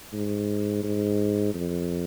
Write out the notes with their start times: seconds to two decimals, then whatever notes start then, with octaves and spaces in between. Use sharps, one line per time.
0.13 G#2
0.84 G#2
1.54 F2